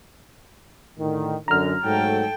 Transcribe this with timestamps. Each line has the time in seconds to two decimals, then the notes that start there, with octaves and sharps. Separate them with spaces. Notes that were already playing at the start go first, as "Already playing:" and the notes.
0.98 A2 D3 D#3
1.48 F#2 D3 A#5 F6
1.84 G#2 F#3 A3 A4 G5